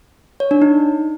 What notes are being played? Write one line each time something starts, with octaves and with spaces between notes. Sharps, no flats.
C#5
D4
D#4